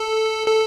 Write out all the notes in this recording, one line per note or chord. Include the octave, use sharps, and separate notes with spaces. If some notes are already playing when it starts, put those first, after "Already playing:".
Already playing: A4
A4